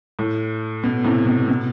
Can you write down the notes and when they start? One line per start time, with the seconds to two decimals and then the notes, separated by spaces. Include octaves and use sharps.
0.19 A2
0.84 B2
1.04 A2 C3
1.26 B2
1.48 B2